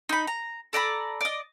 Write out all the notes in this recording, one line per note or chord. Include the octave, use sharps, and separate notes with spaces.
D#4 B5
A#5
A4 D5 A#5 B5
D5 D#5